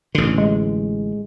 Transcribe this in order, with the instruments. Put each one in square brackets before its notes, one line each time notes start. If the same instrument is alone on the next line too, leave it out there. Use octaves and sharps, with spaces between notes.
[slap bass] A1 D3
[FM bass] G#3